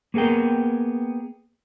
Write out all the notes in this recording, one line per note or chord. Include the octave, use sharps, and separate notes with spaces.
A#3 B3 G#4 A#4 G5